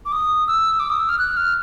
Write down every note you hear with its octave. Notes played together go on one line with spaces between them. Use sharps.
D6
D#6
E6
D6
D#6
E6
F6
F#6
F6